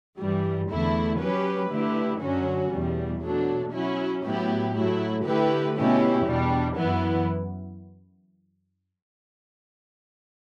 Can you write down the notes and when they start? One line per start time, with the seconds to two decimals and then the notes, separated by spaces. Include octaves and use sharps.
0.18 G2 E3 G3
0.69 E2 D3 A3 E4
1.20 F#3 C#4 G4 B4
1.71 D3 A3 E4 G4 B4
2.21 F#2 D3 F#3 C#4 F#4
2.72 E2 B2 G3
3.22 B2 F#3 A3 D4
3.73 F#3 C#4 E4
4.24 A2 F#3 B3 E4 G4
4.75 A2 F#3 A3 E4
5.25 D3 A3 E4 G4 B4
5.76 B2 A3 C#4 E4 G4
6.27 E2 B2 G3 D4
6.78 F#2 E3 B3 E4